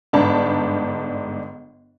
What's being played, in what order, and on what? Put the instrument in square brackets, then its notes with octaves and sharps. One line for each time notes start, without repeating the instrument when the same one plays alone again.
[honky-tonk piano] G1 G#2 D4 A5 B5